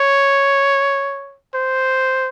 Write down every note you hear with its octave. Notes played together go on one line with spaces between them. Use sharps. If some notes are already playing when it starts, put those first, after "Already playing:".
Already playing: C#5
C5